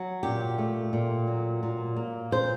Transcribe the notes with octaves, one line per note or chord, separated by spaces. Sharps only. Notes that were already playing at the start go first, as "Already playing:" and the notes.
Already playing: F#3
A#2 G4
A3
A#2
F#3
A#2
A#3
A#2 C5